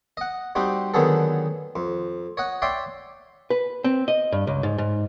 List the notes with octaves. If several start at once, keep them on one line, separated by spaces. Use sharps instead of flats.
D#5 F#5
G3 C4 D#4 F#4 G4
D3 D#3 F#3 B3 G#4 A4
F2
C#5 D#5 F#5
C#5 D5 E5 G5 C6
B4
C4
D#5
G2
C#2
G#2
G#2